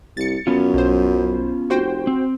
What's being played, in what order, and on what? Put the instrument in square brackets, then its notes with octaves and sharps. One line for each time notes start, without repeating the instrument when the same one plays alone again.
[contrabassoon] C2 [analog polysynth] A6 C#7
[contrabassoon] F#2 [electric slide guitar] B3 C#4 F4
[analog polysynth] B1 C5
[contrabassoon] F1 [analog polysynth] F#4 C5 G5
[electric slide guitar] C4